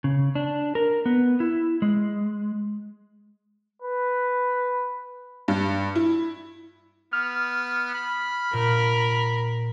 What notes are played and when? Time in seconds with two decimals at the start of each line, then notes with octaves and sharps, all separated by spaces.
0.04 C#3
0.35 D4
0.75 A#4
1.06 B3
1.40 E4
1.82 G#3
3.82 B4
5.48 G2
5.95 E4
7.13 B3 F6
7.95 B5
8.53 A#2 A#4